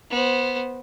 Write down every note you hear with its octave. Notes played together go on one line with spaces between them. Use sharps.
B3 C5